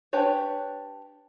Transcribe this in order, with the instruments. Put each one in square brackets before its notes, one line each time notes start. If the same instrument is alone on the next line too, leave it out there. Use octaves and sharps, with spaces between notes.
[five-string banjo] D4 G4 B4 C#5